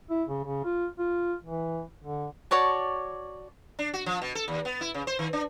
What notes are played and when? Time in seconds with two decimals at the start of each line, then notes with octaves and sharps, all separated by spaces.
0.10 E4
0.29 C#3
0.45 C#3
0.65 F4
0.99 F4
1.45 E3
2.04 D3
2.51 F#4 C#5 D5 A5
3.79 D4
3.94 F#4
4.06 F3
4.22 B2
4.35 A4
4.48 D#2
4.65 B3
4.81 E4
4.94 C#3
5.07 C5
5.19 D#3
5.33 D4